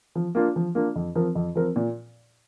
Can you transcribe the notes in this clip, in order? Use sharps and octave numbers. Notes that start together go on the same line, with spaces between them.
F3
A#3 D4 F4
F3
A#3 D4 F4
F2
F3 C4 A#4
F2
F3 C4 A#4
A#2